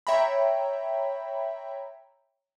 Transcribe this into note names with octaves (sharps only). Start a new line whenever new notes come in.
C#5 E5 G5 A#5 B5